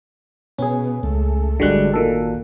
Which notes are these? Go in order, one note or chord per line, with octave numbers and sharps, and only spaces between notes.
B2 C#4 G#4
C#2 A3
G#1 D3 G3 G#3 F#4 F#6
A#2 D#3 A4